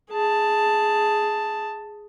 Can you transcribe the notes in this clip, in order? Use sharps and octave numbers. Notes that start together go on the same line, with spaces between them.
G#4 A5